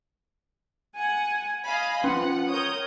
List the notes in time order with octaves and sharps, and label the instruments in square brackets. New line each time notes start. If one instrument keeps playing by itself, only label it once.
[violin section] F#5 [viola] G#5
[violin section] D#5 F5 B5 [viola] G#5
[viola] F3 [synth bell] C#4 [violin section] F#5
[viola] A#4 C#5 [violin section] D#6 G6